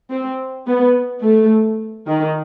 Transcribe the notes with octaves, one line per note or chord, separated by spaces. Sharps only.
C4
B3
A3
D#3